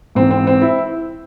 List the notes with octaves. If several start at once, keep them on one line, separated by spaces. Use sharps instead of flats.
G#2 E3 C4
C4
C4
E4